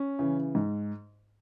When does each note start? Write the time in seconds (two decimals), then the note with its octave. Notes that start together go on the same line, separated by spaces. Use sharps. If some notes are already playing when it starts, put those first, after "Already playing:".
Already playing: C#4
0.19 C#3 E3
0.55 G#2